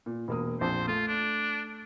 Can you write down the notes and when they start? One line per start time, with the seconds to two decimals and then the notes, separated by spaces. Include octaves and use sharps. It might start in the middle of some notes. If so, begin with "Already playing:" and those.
0.06 A#2
0.28 E1 A#3 D#6
0.61 A#1 F2 C5 A5
0.88 A3 F4
1.08 D4